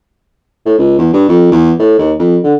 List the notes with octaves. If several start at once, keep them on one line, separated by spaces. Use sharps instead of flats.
A2
C#2
E2
G2
F2
E2
A2
D#2
F2
D3